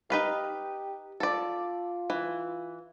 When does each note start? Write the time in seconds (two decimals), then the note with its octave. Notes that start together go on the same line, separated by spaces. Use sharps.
0.10 D#4 G4 B4 F5
1.20 F4 A4 D5
2.10 E3